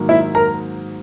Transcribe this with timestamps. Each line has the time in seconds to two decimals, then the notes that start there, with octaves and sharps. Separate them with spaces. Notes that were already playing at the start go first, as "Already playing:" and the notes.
Already playing: G#2 D#3 F#3 A#3
0.09 E4 E5
0.35 A#4 A#5